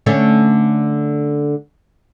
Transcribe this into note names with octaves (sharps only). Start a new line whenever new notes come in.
D3 A3 C#4